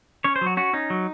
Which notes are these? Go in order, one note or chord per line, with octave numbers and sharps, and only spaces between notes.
C#4 C#5
C5
F#3
F#4
C#4 F#4
C#4 D#4
F#3